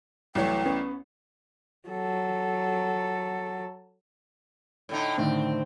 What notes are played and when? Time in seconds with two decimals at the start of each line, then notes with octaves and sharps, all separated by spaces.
0.35 C2 E3 F#3 A3 C#5 G5
0.66 B3 C#4
1.89 F#3 A4
4.89 A2 D3 D#4
5.18 A2 D3 D#3 C4